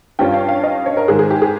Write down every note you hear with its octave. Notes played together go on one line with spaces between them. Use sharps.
G2 G3 C#4 F4 G5
F5
F5
D#5
C#5
A#4
G#2 D#3 G#3 G#4
G#4
G4
G#4